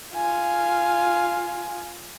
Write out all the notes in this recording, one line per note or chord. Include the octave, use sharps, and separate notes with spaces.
F4 G#5